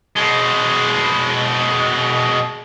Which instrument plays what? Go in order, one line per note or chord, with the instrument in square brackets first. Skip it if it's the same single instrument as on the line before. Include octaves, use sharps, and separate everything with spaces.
[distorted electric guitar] B2 G#3